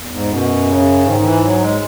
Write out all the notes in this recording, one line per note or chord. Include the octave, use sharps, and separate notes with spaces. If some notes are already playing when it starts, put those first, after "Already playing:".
Already playing: E2
G#2
F#2 B2
C#3
G#2 D#3
D#3
E3
F#3
G#3